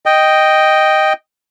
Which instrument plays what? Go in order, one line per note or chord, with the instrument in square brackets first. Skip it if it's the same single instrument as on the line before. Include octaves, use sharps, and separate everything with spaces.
[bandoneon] D#5 G5